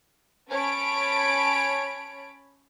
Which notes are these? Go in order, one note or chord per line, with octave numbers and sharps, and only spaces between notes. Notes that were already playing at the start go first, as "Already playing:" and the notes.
C#4 C#5 A5 B5 D7